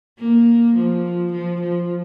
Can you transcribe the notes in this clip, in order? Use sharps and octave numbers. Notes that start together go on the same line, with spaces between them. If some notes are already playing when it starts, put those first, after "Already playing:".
A#3
F3
F3
F3